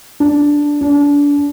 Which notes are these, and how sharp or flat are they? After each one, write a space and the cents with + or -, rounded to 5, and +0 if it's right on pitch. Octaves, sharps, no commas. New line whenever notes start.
D4 -5
D4 -30